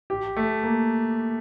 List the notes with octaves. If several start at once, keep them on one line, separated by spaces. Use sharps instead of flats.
G4
A3
A#3